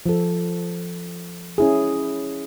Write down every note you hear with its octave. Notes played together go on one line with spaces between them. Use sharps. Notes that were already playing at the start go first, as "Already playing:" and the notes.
F3 A4
C#4 E4 G#4